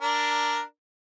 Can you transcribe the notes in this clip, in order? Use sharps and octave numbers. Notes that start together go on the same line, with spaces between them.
D4 A#4